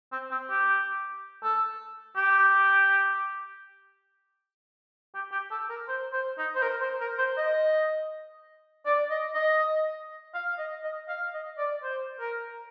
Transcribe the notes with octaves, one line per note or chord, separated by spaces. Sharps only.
C4
C4
G4
A4
G4
G4
G4
A4
A#4
C5
C5
D#4
C5
A#4
C5
A#4
C5
D#5
D5
D#5
D#5
F5
D#5
D#5
F5
D#5
D5
C5
A#4